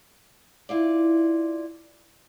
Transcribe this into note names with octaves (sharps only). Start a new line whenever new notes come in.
E4 F4 D5